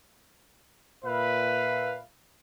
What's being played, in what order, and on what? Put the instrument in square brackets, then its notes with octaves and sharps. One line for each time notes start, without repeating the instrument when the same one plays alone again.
[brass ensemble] A#2 E5 F5 [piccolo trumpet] B4